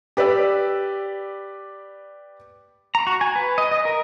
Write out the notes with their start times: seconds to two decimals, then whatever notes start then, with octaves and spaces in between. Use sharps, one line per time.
0.17 G4 B4 D5 E6
2.95 A#5
3.07 F#4
3.21 G#5
3.36 B4
3.58 D#5
3.71 D#5
3.85 A#4